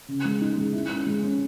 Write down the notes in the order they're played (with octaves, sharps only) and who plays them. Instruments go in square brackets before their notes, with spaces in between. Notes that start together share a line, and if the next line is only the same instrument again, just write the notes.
[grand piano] C#3
G#3
D#4
G#3
E4
C#4
G#3
C#4